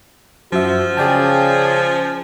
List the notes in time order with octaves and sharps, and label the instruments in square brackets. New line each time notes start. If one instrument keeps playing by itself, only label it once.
[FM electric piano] F#2 E5 [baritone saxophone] F3 [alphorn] F#4
[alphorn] C#3 [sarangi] G#4 [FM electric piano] D5 G5 A5